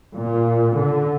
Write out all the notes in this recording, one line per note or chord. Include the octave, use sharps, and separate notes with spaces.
A#2
D3